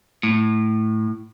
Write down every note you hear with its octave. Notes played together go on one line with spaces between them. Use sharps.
A2